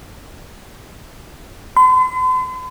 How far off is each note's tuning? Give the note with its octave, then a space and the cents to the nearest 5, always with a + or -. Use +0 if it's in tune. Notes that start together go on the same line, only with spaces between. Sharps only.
C6 -45